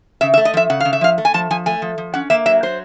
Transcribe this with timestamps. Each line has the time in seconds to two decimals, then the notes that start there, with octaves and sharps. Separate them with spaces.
0.21 C#3 E5
0.34 E5
0.37 A3
0.45 D#5
0.54 F3 E5
0.70 C#3 F#5
0.80 C#3 F5
0.93 E5
1.01 F3 F5
1.18 A3
1.25 G#5
1.34 F3 A5
1.50 F3 G#5
1.66 A3 G#5
1.82 F3
1.98 F3
2.14 C#4 F#5
2.30 A#3 E5
2.46 F#3 E5
2.63 F#3 C5